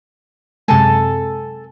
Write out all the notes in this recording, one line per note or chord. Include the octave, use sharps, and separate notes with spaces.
F#2 C3 G#3 A4 G#5 A5